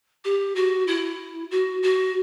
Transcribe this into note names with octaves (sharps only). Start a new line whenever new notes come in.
G4
F#4
E4
F#4
F#4